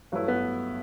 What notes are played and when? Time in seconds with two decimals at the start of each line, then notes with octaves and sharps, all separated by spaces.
0.12 G2 F#3 A3 E4 B4
0.28 B3